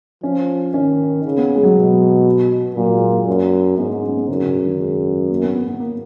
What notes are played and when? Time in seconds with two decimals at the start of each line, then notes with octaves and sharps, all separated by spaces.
0.23 F3 C#4
0.74 D#3 C#4
1.24 C#3
1.37 B3
1.56 G#3
1.63 F#3
1.75 B2
2.76 A#2 F#3
2.93 G#3
3.11 A#3
3.27 F#2
3.78 G#2 B3
3.90 B3
4.03 C#4
4.16 B3
4.28 F#2 C#3
4.41 C#3
4.54 C#3
4.66 D#3
4.79 G#3
5.30 A#3
5.43 B3
5.55 B3
5.68 B3
5.80 A#3